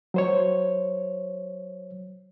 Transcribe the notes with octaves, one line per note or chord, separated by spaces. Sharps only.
F#3 C5 C#5